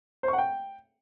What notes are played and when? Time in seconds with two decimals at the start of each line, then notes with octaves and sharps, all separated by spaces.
0.23 C5
0.28 C#6
0.33 F#5
0.38 G5